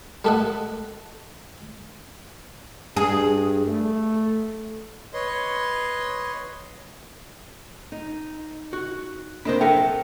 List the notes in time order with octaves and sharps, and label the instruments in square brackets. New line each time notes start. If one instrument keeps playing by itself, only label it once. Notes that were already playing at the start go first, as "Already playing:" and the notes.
[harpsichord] G3 A3 A4 D#5 F#5
[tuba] G2 [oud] G#4
[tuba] A3
[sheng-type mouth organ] B4 C#5 D#5 C6
[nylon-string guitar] D#4
[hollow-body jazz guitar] F#4
[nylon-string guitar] C3 A#3 D4 [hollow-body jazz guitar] C5 D#5 B5
[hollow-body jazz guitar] F#3 A#4 E5 [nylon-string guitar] A4 [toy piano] G5